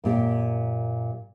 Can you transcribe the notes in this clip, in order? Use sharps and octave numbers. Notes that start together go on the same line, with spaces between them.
F#2 A#2 G4